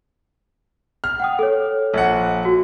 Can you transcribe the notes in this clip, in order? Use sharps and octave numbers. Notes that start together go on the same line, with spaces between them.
F6
F#5 G5 D#6
A4 C#5
A#1 F#5
F#4